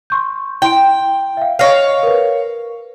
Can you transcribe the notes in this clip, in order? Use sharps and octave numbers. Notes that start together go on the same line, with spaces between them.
C6 C#6 G6
E4 G5 C6 D7
E5 F5
C#5 D#5 F5 A#6 C7
A#4 B4